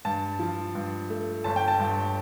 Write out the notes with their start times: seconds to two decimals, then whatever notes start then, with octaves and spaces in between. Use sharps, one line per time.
0.05 G2 A5
0.39 F3
0.75 G2
1.10 A3
1.44 G1 A5
1.56 G5
1.68 A5
1.79 G2